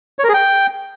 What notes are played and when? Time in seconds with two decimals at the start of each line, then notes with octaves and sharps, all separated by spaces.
0.19 C#5
0.24 A#4
0.29 G#4
0.34 G5